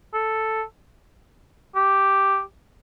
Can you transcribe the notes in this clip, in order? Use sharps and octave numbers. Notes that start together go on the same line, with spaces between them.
A4
G4